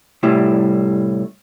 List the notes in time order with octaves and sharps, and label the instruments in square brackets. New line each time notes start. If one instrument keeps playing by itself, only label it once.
[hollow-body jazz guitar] C2 A2 G3 E4